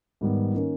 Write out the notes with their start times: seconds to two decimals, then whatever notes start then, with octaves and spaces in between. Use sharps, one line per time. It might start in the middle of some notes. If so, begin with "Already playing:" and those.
0.21 G#2 D#3 G3 B3
0.55 D#3 A#3 C#4